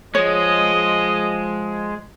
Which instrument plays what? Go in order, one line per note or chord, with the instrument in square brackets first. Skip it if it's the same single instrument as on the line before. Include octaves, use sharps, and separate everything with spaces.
[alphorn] F3 [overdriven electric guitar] G#3 [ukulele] C#5 [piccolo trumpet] D#5